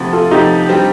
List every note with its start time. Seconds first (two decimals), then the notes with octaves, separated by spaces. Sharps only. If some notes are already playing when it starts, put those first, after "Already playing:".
Already playing: D2 C3 F3
0.13 F4 A4
0.31 D2 C3 F3 D#4 G4
0.69 D3 G3 C4